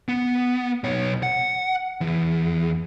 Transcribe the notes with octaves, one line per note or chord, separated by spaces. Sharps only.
B3
B1 C#5
F#5
E2